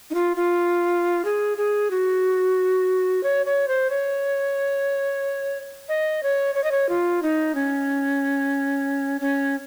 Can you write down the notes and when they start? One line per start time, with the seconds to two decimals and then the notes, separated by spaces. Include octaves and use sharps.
0.10 D#4
0.15 F4
0.36 F4
1.25 G#4
1.58 G#4
1.91 F#4
3.23 C#5
3.46 C#5
3.68 C5
3.90 C#5
5.89 D#5
6.23 C#5
6.55 C#5
6.64 D#5
6.72 C#5
6.89 F4
7.23 D#4
7.55 C#4
9.21 C#4